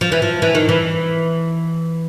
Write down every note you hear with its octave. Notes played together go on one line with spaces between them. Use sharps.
F3
E3
F3
E3
D#3
E3